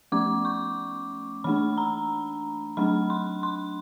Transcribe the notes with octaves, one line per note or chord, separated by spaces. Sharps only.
F3 A3 C#4 D6
C#6
E3 A3 D4 B5
A#5
F#3 A3 D4 B5
C6
C6